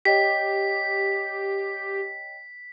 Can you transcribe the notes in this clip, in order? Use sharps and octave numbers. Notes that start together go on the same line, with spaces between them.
G4 C#5 D#5 G5 B6